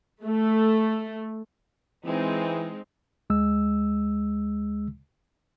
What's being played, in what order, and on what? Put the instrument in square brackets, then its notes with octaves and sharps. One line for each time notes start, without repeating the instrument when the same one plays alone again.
[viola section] A3
[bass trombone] E3 [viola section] G#3 C4 D#4
[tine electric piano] D2 G#3 E6